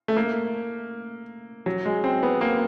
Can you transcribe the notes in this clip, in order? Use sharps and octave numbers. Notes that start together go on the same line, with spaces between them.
A3
A#3
F#3
G#3
C4
B3
A#3